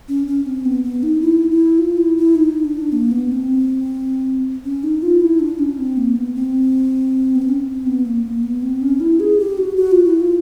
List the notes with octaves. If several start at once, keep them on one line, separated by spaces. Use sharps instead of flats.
C#4
C#4
C4
B3
B3
D#4
E4
E4
F4
E4
E4
D#4
D4
A#3
B3
C4
C#4
D#4
F4
E4
D4
C#4
C4
A#3
B3
C4
B3
C4
C#4
C4
B3
A#3
A#3
B3
C4
C#4
E4
G#4
G4
F#4
F#4
F4
E4
F4